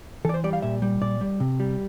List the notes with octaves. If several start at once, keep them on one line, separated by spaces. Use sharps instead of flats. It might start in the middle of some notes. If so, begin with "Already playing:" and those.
E3 A4 D5
C5
G3 D5
F5
A#2 E5
G3
A#2 D5
G3
C3
G3